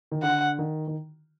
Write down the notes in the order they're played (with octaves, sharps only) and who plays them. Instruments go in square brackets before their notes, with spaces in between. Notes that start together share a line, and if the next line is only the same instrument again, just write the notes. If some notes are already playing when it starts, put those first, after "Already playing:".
[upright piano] D#3
[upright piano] D3 [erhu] F#5
[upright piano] D#3
D#3